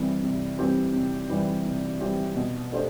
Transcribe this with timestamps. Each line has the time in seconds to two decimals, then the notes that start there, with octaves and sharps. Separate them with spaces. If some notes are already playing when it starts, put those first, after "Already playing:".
Already playing: C3 E3 G3 C4 G4
0.23 C3
0.58 E3 G3 C4 G4
0.94 C3
1.29 E3 G3 C4 G4
1.65 C3
2.00 E3 G3 C4 G4
2.35 B2
2.71 A3 D4 G4 C5